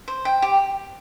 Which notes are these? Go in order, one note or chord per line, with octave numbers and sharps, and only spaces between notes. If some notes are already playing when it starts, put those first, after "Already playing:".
C5
G5
G4